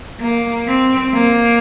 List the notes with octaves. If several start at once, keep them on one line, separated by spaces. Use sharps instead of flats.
A#3
C4
A#3